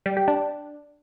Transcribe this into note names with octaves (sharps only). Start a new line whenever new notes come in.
G3
G4
D4